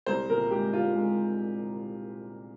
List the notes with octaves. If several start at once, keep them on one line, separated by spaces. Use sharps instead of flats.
C2 C5
A#2 A#4
G#3 G4
C2 F4
G#3